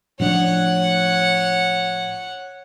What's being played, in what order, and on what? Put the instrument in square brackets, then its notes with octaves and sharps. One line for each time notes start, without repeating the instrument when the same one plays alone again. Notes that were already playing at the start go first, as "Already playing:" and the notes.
[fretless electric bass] A2 F3 D4 [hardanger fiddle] C#5 F#5